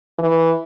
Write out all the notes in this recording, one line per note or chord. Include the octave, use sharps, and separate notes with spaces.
E3